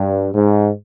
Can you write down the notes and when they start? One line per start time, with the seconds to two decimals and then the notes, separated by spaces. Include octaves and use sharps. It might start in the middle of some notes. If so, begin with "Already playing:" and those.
Already playing: G2
0.33 G#2